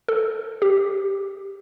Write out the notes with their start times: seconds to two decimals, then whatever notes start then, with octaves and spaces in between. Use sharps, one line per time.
0.08 A4
0.62 G4